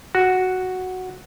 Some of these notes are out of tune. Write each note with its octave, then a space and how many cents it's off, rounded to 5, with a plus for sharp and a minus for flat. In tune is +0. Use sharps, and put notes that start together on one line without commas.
F#4 +0